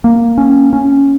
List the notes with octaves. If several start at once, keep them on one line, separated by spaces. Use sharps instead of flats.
A#3
C#4
C#4